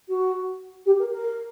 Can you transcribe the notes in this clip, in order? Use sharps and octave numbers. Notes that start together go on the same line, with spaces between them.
F#4
G4
A#4
A#4